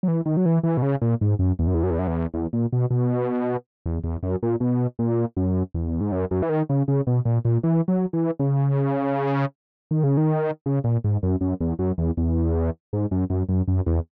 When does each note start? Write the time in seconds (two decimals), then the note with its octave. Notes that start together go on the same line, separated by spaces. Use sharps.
0.03 F#3
0.08 E3
0.26 D#3
0.37 F#3
0.46 E3
0.63 E3
0.77 B2
0.82 C#3
1.02 A#2
1.21 G#2
1.39 F#2
1.59 E2
1.67 F#2
1.74 E2
1.83 F#2
1.90 E2
1.99 F#2
2.07 E2
2.34 E2
2.53 A#2
2.73 B2
2.90 B2
3.86 E2
4.04 E2
4.23 F#2
4.43 A#2
4.60 B2
4.99 A#2
5.37 F#2
5.74 E2
6.01 G#2
6.12 F#2
6.31 F#2
6.42 E3
6.49 D#3
6.69 C#3
6.88 C#3
7.07 B2
7.25 A#2
7.45 A#2
7.63 E3
7.88 F#3
8.13 E3
8.39 C#3
9.91 D#3
10.04 C#3
10.17 D#3
10.66 C#3
10.84 A#2
11.04 G#2
11.23 F#2
11.41 F#2
11.60 E2
11.79 F#2
11.98 E2
12.17 E2
12.93 G#2
13.11 F#2
13.30 F#2
13.49 F#2
13.68 F#2
13.86 E2